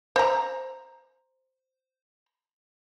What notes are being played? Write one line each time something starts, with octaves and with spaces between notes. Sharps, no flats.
C5 A#5